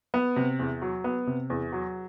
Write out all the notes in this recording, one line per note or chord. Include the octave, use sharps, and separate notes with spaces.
B3
C3
E2
F#3
B3
C3
E2
F#3